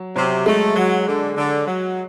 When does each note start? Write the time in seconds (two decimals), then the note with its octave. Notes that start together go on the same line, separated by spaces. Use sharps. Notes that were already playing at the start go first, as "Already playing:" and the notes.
Already playing: F#3
0.16 C3 F#3
0.46 G#3 A3
0.76 F#3
1.06 D3
1.37 D3
1.66 F#3